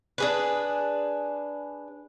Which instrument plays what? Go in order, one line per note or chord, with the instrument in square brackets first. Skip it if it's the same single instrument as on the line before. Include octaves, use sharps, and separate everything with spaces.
[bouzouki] D4 G#4 B4